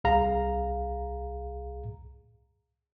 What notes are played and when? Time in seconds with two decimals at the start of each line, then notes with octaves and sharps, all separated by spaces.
0.04 C2 G#4 F5 A#5